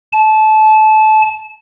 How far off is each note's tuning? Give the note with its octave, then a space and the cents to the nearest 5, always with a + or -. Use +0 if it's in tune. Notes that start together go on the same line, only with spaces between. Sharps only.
A5 -25